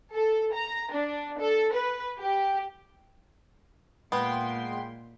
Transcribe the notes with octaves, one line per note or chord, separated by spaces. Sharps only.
A4
A#5
D4
A4
B4
G4
A#2 G#3 B3 G5 C6